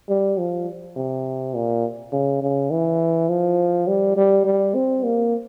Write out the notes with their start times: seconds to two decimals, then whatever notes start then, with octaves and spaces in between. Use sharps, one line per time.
0.09 G3
0.38 F3
0.97 C3
1.55 A#2
2.12 C#3
2.42 C#3
2.71 E3
3.29 F3
3.88 G3
4.17 G3
4.45 G3
4.75 C4
5.04 A#3